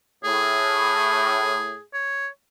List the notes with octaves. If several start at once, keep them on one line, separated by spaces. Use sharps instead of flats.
A2 G#4
C#5